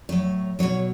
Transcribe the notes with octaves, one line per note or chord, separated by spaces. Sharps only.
A2 F#3 C#5
B2 F#3 C#5